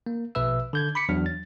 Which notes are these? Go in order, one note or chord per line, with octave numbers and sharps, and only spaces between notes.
A#3
A#1 B2 B4 E5 E6
D3 G6 G#6
B5 D6 B6 C#7
E2 F#3 D4 F6
A6